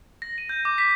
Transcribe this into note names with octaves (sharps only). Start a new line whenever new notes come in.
A#6
D#7
G6
D6
B6